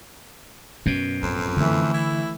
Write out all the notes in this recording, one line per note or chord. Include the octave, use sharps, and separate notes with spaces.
F#2 B2 C#4
A1 F2
D3 E3 A3
E4